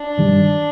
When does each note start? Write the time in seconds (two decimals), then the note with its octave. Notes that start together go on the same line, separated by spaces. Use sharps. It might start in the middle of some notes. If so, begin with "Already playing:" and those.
Already playing: D4
0.18 G2 D#3 G3